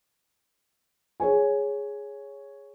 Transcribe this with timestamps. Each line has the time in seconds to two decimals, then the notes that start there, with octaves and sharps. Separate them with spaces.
1.20 G#4 C#5 G#5